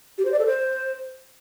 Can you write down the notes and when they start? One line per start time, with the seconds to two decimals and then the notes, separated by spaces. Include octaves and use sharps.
0.18 G4
0.25 C5
0.32 D5
0.39 A4
0.46 C5